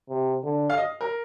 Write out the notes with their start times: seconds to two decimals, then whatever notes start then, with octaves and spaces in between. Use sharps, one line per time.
0.09 C3
0.43 D3
0.70 F5
0.78 D#5
1.01 A#4